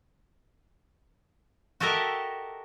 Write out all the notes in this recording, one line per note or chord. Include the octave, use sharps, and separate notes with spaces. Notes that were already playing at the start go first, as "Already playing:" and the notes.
F#4 G4 A4 A#4 D#5 E5